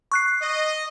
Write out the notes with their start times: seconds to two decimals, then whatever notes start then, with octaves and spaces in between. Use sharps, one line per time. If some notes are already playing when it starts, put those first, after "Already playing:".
0.12 C#6 F#6 C7
0.42 D#5